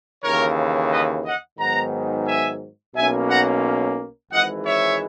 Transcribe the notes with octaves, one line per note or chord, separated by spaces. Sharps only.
D#2 C#3 E3 A#4 C#5
B4 D#5
D#5 F#5
G#2 D#3 F#3 B3 F#5 A#5
E5 G#5
B1 B2 A#3 C#4 E5 G#5
F#5 A#5
G#1 G#2 E3 G#3 D#5 F#5
C#5 E5